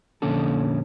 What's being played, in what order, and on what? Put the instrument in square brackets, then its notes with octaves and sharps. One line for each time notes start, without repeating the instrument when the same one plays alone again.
[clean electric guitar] F2 A#2 D3 C#4 A4